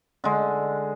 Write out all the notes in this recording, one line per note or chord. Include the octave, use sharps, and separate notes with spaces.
D3 G#3